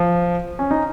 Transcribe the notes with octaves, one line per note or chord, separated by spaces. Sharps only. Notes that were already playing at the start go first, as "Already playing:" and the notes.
Already playing: F3
C#4
D#4